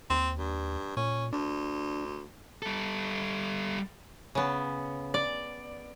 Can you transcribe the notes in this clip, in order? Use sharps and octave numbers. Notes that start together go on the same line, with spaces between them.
D#2 C4
G2
A#2 C#4
D2 D4
G3 A4
C#3 B3
D5